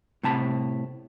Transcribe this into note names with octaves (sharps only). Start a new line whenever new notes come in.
A2 C3 A5 B5